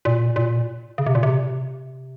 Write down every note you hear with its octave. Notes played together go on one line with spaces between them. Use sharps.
A#2
A#2
C#3
C3
A#2
C3